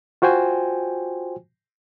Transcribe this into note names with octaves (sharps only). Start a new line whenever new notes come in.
F4 F#4 C5 G5 G#5